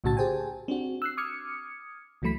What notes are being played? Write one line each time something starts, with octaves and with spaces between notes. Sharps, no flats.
B1 A2 C#3 F#4 A5 A6
G4 G#4 C5 G5 G#5
C4 D4 F#4
E6 F#6 C7
D6 D#6 F6 G#6 C#7
C#2 E3 F#3 A3 B5 B6